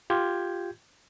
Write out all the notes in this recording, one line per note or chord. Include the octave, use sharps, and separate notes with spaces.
F4 G4 G6 G#6